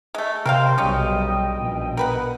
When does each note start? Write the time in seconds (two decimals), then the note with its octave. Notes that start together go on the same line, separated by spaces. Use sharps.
0.15 G#3 A3
0.46 C3 G3 C4 A#4 C5 F5
0.78 B1 G3 G#3 C#4 D#5 G5
1.54 A#1 B2
1.97 A#4 B4 F#5